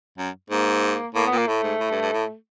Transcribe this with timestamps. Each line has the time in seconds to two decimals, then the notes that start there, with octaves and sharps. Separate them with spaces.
0.18 F#2
0.50 G#2 A#3
1.15 A2 A#3
1.26 B3
1.32 A#2 A#3
1.47 A2 A3
1.63 G#2
1.80 A2
1.91 G2
2.02 G2
2.13 A2